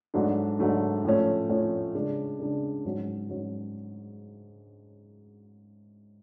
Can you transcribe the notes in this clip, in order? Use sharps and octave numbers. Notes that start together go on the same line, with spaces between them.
G#2 F#3 A3 D4
G#2 F#3 A3 D4
A2 F3 A3 C#4
A2 F3 A3 C#4
C#3 G#3 D4
C#3 G#3 D4
G#2 F#3 C#4
G#2 F#3 C#4